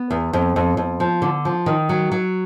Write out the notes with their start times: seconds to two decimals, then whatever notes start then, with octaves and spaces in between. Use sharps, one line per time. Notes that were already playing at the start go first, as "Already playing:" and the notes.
Already playing: B3
0.11 E2
0.33 F2
0.56 F2
0.77 F2
1.00 F3
1.22 D3
1.45 F3
1.66 D#3
1.89 F#3
2.12 F#3